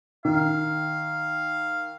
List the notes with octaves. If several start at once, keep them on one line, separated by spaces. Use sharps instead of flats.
D#3 F5